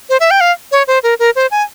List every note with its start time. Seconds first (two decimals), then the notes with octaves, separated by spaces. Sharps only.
0.10 C5
0.20 E5
0.31 G5
0.41 F5
0.72 C#5
0.88 C5
1.03 A#4
1.19 A#4
1.36 C5
1.51 G#5